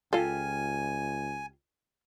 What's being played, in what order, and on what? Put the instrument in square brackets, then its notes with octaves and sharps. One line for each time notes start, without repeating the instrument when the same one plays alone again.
[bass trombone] C#2 [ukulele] F4 G4 [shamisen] A4 F5 [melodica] G#5